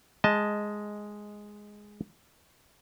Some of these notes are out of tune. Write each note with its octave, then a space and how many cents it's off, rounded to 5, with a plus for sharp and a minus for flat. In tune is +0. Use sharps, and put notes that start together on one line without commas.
G#3 +0 D#5 +10 A5 +0